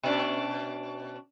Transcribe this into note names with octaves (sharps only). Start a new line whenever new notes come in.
B2 C#4 D4